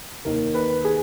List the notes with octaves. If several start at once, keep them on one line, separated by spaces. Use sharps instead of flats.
D#2 D#3 A#3 A#4
B4
G#4